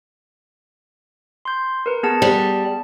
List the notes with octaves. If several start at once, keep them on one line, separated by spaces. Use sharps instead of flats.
C6 G6
A#4 B4
B3 G#4 A5
G3